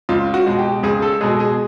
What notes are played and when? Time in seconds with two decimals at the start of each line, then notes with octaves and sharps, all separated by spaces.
0.09 C#2 F4
0.34 F#4
0.47 B2 G#3
0.59 G4
0.83 C#2 G#4
1.02 A4
1.21 B2 G#3 G#4
1.40 G#4